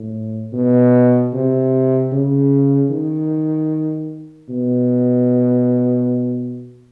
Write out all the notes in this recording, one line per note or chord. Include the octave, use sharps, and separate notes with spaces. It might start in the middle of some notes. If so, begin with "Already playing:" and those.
Already playing: A2
B2
C3
C#3
D#3
B2